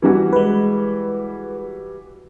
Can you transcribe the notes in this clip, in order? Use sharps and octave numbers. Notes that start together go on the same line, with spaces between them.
E3 G3 F#4
G#3 B4